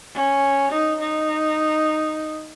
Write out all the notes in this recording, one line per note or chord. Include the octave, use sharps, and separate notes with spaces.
C#4
D#4
D#4